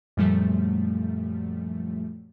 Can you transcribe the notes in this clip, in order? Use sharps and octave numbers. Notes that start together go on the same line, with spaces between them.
F#2 A#2 F3 G3 A3